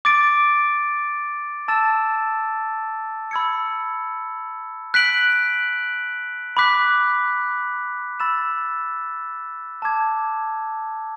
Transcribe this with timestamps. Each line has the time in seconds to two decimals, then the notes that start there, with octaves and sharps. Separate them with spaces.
0.05 D6 A6 D7
1.68 A5 E6 A6 E7
3.31 B5 E6 G#6 C#7
4.94 F#6 B6 D7 F#7
6.57 B5 D6 F#6 B6
8.20 B5 E6 A6 E7
9.82 A5 D6 G#6